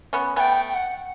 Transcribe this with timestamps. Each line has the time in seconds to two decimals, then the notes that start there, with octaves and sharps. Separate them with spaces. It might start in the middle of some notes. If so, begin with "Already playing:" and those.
0.13 B3 C#4
0.36 A3 B3 G5 G#5
0.70 G5
0.74 F#5